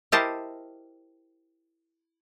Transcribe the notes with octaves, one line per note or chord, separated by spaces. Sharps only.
E4 G4 A#4 C5 D#5 A5